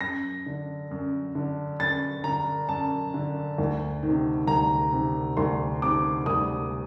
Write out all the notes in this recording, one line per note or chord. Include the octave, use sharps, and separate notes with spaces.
F#2 A#6
D3
F#2
D3
F#2 A6
D3 A#5
F#2 A5
D3
D2
C3 D#3
D2 A#5
C3 D#3
D2 C6
C3 D#3 D6
D2 D#6